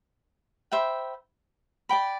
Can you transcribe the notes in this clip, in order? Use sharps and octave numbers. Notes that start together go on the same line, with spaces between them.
C5 E5 G5 B5
D5 G5 B5